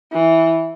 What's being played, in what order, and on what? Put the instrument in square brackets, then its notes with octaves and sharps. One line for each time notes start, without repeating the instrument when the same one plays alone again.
[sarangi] E3